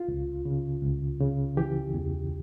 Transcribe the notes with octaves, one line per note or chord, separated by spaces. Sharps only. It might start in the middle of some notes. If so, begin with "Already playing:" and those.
Already playing: F4
C#2
C#3
C#2
C#3
E3 G4
E2